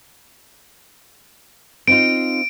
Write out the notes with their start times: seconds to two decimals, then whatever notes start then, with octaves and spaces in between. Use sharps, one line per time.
1.87 C4 D#4 F4 D7